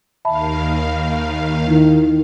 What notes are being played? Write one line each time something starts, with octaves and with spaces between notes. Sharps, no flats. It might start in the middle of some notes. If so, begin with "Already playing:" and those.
D#2 D#3 E5 F5 A5 B5
D#3 D#4 E4